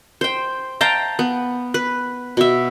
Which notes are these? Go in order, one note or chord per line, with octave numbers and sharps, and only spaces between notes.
C5 G5
F5 G5 A5 A#5
B3
B4
B2 E5